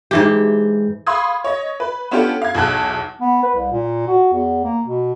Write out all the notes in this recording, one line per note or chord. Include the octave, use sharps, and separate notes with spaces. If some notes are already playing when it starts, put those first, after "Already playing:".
G#2 E3 G4
F5 B5 C6 D#6 G#6
C#5 D#5
B4
B3 C#4 D4 F4 G4 A4
F5 G#6
B1 E2 A5 F#6
B3
B4
C2
A#2
F#4
E2
A#3
B2